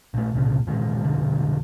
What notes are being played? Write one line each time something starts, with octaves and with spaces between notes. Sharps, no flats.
A#1 A3
F1 C2 A#2 C#3
F#2 A#2 D#3 G#3
B1 F2 D3 G3